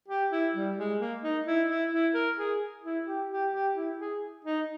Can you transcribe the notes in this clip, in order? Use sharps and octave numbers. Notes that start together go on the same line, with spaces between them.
G4
E4
G3
G#3
A#3
D#4
E4
E4
E4
A#4
G#4
E4
G4
G4
G4
E4
G#4
D#4